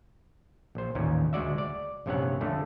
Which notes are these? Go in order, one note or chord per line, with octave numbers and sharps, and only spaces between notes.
A#1 C5
A1 D#2 A#2 C#4
D2 G#3 F#4 D5 E5
D5
A#1 G2 C3 C#4 C#5 F#5
F2 D3 A3